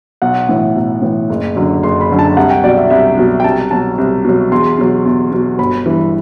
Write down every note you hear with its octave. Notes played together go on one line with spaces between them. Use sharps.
B1 F#5
A2 E3
B1
A2 E3
F#1
F#2 D3 F#3
F#1 C6
B5
F#2 D3 F#3
A5
C2 F#5
G5
B2 F#3 D5
E5
C2 E5
B2 F#3
G5
C2 A5
B2 F#3 A5
C2
B2 F#3
E2 C6
B2 F#3
E2
B2 F#3
G1 B5
G2 E3